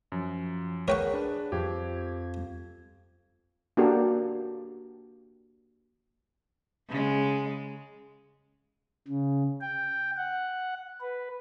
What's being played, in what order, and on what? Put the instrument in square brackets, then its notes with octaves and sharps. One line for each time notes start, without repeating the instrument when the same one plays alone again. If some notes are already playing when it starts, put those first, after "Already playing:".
[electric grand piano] F#2 [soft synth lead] F3
[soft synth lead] G#4 [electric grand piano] A#4 B4 F#5 [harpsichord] C#5 G5 C#6
[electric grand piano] D4 B4
[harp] F2 [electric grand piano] G4 [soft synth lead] G#6
[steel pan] A#3 D4 F#4 G4 A4
[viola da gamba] C#3 G#3
[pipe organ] C#3
G5
F#5
B4